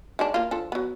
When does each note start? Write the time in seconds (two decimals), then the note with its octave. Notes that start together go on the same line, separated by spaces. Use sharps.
0.19 D#3 G#3 D4
0.34 A#3 F4
0.51 F3 D4 A4
0.72 F#3 B3